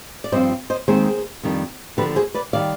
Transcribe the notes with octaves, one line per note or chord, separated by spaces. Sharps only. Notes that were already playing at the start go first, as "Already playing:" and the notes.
D5
G2 F3 C4 F4 C5 D#5
C5 D#5
D#2 D#3 G#3 C4 D#4 G#4 C5
F2 D#3 G3 D4
D#2 D3 F3 G4 B4
G#4 C5
B4 D5
D#3 G3 D5 F5